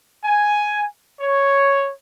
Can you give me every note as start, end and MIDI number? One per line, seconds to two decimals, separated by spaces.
0.25 0.84 80
1.21 1.91 73